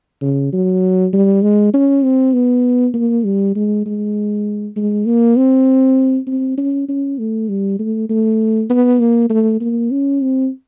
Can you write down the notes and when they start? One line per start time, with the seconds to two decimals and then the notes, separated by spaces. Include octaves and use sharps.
0.21 C#3
0.52 F#3
1.13 G3
1.42 G#3
1.74 C#4
2.03 C4
2.33 B3
2.94 A#3
3.24 G3
3.55 G#3
3.86 G#3
4.76 G#3
5.06 A#3
5.36 C4
6.27 C4
6.58 C#4
6.89 C#4
7.18 A3
7.49 G3
7.79 A3
8.09 A3
8.70 B3
8.99 A#3
9.30 A3
9.61 A#3
9.91 C#4
10.22 C4